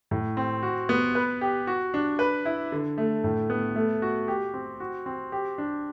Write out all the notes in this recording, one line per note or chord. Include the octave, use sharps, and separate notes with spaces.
A2
C4
F#4
B3
B4
G4
F#4
D4
B4
E4
D3
A3
A2
B3
A3
F#4
G4
C4
F#4
C4
G4
D4